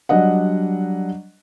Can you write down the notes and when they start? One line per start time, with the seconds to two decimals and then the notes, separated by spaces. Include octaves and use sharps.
0.09 F#3 G3 D4 D#5 F#5